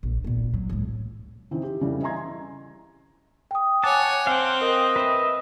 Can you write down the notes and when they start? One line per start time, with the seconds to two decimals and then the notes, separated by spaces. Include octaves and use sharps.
0.03 A#1
0.24 A#2 B3
0.54 F#3
0.69 C#2 A2
1.51 C#3 E3 C4 D#4
1.63 G4
1.81 F2 C#3 E3 G3
2.02 D#5 E5 G#5 A#5 C6 G#6
3.51 G5 D#6
3.84 C#5 F#5 G#5 A5 D6
4.27 C4 F5 G5
4.61 A#4 D#5
4.96 B4 E5